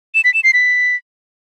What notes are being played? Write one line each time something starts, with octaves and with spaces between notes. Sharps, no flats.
E7
B6
E7
C7
B6